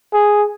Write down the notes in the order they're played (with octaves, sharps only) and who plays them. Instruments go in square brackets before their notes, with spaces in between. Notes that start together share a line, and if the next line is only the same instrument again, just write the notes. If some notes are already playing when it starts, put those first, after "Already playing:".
[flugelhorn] G#4